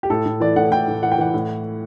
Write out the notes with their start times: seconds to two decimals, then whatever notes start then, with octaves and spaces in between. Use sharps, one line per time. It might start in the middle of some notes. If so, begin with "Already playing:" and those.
0.03 G4
0.10 A2 A4
0.26 A2
0.40 E3 D5
0.56 A2 F#5
0.71 A2 G5
0.88 A2
1.03 E3 F#5
1.12 G5
1.18 E3 F#5
1.34 A2